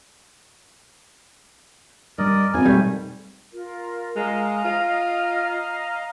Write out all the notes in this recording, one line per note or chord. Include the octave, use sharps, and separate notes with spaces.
G2 G3 A#4 D5 D#5
G#1 F2 C4 G#5
B2 G3 A3
F4 A#4
G#3 D#5 F5 A#5
F4 F6